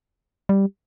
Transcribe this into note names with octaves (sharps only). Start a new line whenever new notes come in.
G3